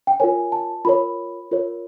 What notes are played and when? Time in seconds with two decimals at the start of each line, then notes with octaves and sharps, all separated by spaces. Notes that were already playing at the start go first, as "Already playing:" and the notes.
0.07 G5
0.20 F4 A#4 C#5 G#5
0.52 A5
0.85 F4 A#4 C#5 B5
1.51 F4 A#4 C#5